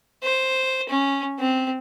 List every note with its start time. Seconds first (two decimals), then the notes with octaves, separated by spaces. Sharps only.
0.23 C5
0.89 C#4
1.39 C4